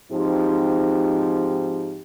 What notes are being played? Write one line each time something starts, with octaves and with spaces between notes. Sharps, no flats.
G#2 F3 C4 D#4 G4